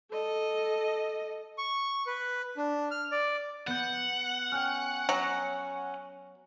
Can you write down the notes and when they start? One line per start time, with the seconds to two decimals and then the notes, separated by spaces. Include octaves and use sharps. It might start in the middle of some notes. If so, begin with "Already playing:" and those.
0.11 A4 D#5
1.58 C#6
2.06 B4
2.57 D4
2.91 F6
3.11 D5
3.67 B3 F#5 G6
4.52 C#4 G5 F6
5.09 F#3 C#4 F#6 A#6